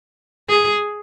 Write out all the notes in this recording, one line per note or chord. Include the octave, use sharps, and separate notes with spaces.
G#4